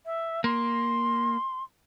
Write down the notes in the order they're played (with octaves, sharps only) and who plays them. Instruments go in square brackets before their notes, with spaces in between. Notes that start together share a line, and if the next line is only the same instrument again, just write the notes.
[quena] E5
[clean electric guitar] A#3 [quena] C6